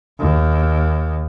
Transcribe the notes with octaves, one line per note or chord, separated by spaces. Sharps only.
D#2